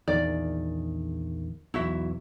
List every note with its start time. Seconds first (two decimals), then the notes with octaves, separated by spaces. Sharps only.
0.08 A#1 E2 D#3 D5
1.74 B1 E2 E4 F#4 E5